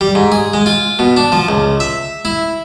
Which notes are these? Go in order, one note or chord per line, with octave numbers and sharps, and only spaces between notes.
G3
G#2
G#4
G#3
F4
B2
D4
F3
C#2
E5
E4